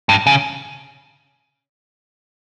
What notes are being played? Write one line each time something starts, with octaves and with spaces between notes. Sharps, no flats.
G2
C#3